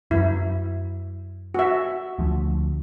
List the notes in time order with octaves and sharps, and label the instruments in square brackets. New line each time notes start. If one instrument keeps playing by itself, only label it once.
[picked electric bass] F#2 F#3 [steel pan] E4
[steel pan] F#4 E5
[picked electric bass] D2 F3